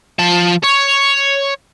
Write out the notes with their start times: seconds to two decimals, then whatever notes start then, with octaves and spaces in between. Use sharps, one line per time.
0.19 F3 A5
0.63 C#5